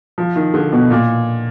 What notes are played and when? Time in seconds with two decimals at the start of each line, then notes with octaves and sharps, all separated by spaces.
0.18 F3
0.36 D#3
0.54 D3
0.72 B2
0.90 A#2